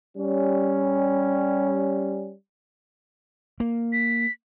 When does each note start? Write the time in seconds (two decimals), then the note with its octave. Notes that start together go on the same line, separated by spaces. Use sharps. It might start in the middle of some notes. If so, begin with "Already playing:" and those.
0.17 G3 C#4
3.60 A#3
3.93 B6